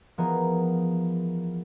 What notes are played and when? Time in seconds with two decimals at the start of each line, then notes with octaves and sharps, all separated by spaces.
0.18 E3 F3 B3 G#4 A#4 D#5